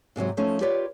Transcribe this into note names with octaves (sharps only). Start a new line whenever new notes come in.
G#2 C3 D#3 F#3
F3 A3 C#4 D#4
F4 G4 B4 C#5 D5